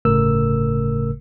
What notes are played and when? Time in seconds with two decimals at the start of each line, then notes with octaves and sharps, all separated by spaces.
0.05 G1 A2 C#3 A3 A#4 E6